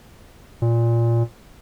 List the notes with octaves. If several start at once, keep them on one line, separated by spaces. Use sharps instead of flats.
A#2